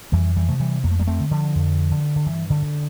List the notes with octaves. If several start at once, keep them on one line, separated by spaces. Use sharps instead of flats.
F2 E3 G3
E3 G3
C3 A3
E3 G3
F2 A#3
A3
G3 A#3
A3 C4
D3
D3 F3
F2
D3
D3
G2 E3
D3
D3